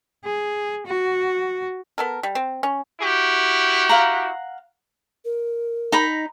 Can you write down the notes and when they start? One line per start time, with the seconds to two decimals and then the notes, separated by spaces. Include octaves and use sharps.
0.25 G#4
0.87 F#4
1.98 B3 A4 A#4
2.23 G3
2.35 C4
2.63 C#4
3.01 E4 F#4 G4
3.89 F5 F#5 A#5
5.25 A#4
5.92 D#4 A#5 B5